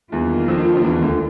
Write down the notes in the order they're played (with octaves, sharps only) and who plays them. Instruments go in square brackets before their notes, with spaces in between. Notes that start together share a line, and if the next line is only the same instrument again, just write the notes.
[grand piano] E2 E3 [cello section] D#3 G3 A#3 D4 F4
[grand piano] F2 F3
F3
E2 E3
D2 D3